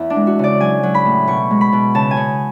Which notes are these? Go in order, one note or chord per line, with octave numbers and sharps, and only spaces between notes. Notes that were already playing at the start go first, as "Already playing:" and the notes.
Already playing: E2 E4
D4
G#3
F#4
C#3 D5
F#3 G#5
F#3
B5
A2
B2 C#6
G#3
B5
B2
C#3 A5
G#5
C#3